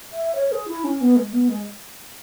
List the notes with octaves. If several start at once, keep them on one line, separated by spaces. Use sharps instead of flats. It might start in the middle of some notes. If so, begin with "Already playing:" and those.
E5
C#5
G#4
E4
C#4
B3
G#3
B3
G#3